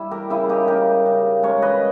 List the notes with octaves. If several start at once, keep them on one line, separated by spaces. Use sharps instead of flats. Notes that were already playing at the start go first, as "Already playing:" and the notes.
Already playing: G3 E4
G4 A#4
C#3 E4 G#4
D#4 G4
C#3 G4 A#4
C#3
G#3 A#4 C#5
B4 D#5